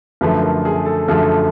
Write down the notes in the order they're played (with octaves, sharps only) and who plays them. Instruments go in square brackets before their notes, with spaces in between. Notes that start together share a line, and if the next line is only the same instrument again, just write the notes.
[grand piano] F#2 D3 F3 A3 B4
A#4
G#4
A4
F#2 D3 F3 A3 A4